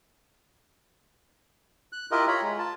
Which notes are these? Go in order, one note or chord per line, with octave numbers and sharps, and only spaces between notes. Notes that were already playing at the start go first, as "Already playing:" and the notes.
F#6
E4 F4 G4 A#4 D#5
F4 C#5 A#5 B5
G#3
F4 A5